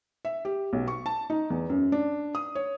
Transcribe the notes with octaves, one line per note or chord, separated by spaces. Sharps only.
E5
G4
B1
C#6
A5
D#4
E2
F#2
D4
D#6
C#5